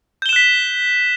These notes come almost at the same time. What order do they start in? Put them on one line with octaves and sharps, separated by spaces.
G6 G7 E7 F#6 B6